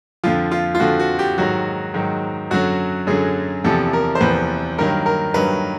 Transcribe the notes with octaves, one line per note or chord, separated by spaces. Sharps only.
F2 D3 F3 F4
F4
F4
F2 D3 F3 F#4
F#4
G4
G#2 D#3 F#3 F#4
G#2 D#3 F#3
F#2 D3 F#3 F#4
F#2 D3 F#3 G#4
E2 C3 F3 A4
A#4
C5
E2 C3 F3 B4
G2 D#3 F#3 A#4
A#4
G2 D#3 F#3 B4